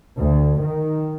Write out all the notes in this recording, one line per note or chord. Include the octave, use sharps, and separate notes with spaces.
D2
D#3